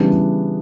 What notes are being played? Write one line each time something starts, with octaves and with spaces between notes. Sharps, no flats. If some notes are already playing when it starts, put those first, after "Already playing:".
Already playing: C#3 E3 G3 B3 D4